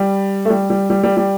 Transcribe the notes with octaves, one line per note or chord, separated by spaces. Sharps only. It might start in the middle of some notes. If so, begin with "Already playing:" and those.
Already playing: G3
A3
G3
G3
G3
G3
G3